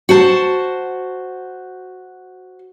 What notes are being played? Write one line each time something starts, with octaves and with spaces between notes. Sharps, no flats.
F#4 C5 A5